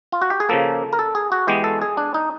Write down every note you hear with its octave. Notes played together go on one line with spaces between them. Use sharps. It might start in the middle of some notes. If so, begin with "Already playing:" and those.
F4
F#4
G4
G#4
C#3 F3 A#3 A4
A#4
A4
G#4
F#4
E3 G#3 B3 G4
A4
G#4
D4
D#4